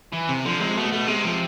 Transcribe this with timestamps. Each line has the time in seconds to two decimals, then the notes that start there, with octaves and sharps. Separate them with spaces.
0.13 E3
0.29 C3
0.45 D3 F3
0.60 C3 G#3
0.76 B2 A3
0.92 A3
1.08 C3 G#3
1.24 F3